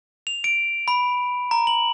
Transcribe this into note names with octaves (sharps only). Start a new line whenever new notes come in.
F7
D7
B5
A#5
F#7